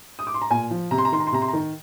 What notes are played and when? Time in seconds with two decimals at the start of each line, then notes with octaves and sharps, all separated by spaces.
0.19 D#6
0.27 D6
0.34 C6
0.42 A#5
0.50 A#2 G#5
0.71 F3
0.91 C3 A#5
0.98 C6
1.05 A#5
1.12 D#3 C6
1.20 A#5
1.27 C6
1.32 C3 A#5
1.42 C6
1.48 A#5
1.53 D#3